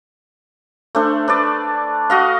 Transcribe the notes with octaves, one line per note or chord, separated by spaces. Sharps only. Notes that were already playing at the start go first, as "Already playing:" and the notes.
A3 D4 C5
D4 B4 D5
F#4 D#5 F5